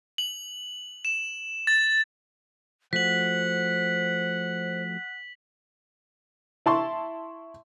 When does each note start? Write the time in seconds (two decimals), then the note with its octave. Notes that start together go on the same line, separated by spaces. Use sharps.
0.18 F#7
1.05 E7
1.67 A6
2.93 F3 A3 F#4 C5 F#5 B6 F#7
6.66 E4 A5 C6 C#6